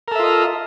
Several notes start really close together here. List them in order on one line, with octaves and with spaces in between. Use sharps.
A#4 A4 E5 F4 D#5